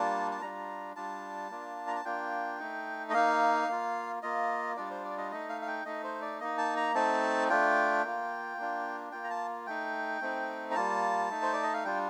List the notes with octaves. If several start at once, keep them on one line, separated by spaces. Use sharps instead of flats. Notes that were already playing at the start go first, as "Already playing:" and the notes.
Already playing: G3 A#3 D4 F4 A5
A5
G3 D4 F4 A#5
G3 D4 F4 A5
A#3 D4 F4
A#5
A5
A#3 D4 F4 G5
A3 D#4
D#5
A#3 D#4 F5
A#3 F4
A#3 F4 D#5
G3 D4 F4 D5
C5
D5
D#5
A3 D#4 D#5
F5
F5
G5
A3 D#4 D#5
C5
D5
A#3 D#4 D#5
A5
A#5
A3 C4 D#4 A5
A3 D4 F4 G5
A#3 F4
A#3 D4 F4
A#3 F4 G5
A#5
A5
A3 D#4 G5
A3 C4 D#4
A#5
G3 A#3 F4 A5
A3 D#4
C5
D5
D#5
F5
G3 D4 F4 G5